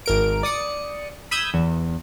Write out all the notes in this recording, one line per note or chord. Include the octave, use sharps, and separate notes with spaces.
G#1 A#4 D7
D5 D#6 C#7
B5 D#6 E6 G6 G#6
E2